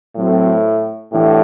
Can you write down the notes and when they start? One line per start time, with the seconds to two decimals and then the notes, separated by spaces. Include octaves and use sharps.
0.16 A2 F#3 A3 C4 F#4 A4
1.12 A2 E3 B3 D4 G4